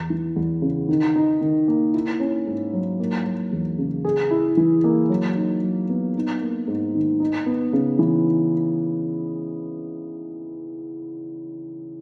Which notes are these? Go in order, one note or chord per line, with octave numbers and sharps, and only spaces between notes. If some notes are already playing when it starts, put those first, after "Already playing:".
Already playing: E2
E3
E2
C#3
D#3
D#4
D#3
A#3
E4
C#4
G#2
F#3
A#3
F#3
E2
C#3
G#4
E4
E3
A#3
F#3
D#4
F#3
B3
D#4
A#3
G#2
D#3
D#4
B3
C#3
E3